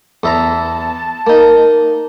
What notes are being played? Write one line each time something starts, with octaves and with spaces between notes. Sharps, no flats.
E2 E5 A5 A#5
A#3 D#4